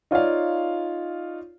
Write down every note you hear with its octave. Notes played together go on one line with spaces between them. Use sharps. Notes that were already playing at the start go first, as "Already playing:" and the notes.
D#4 F4 C#5 D5 F5